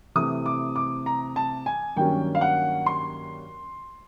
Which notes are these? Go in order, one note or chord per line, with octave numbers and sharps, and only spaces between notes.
C3 E3 A3 D#6
D6
D6
A#5
A5
G#5
G2 D#3 F#3 A#3 C#4 G5
F5
F#5
C6